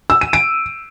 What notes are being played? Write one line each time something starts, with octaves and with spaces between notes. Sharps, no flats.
E6
D#7
D7